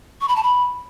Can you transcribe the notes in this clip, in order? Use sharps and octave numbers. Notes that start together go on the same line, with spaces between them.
C#6
B5
A5
B5